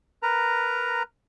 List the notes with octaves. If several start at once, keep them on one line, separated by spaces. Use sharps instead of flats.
A#4 B4 A#5